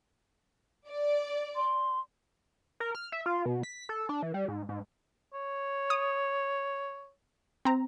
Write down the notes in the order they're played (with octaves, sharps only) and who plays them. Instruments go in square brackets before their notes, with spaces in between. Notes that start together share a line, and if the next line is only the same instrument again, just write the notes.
[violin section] D5
[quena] C6
[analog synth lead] A#4
F6
E5
F4
B2
B6
A4
D4
E3
G3
G#2
G#2
[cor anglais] C#5
[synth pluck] D#6
C4 A#5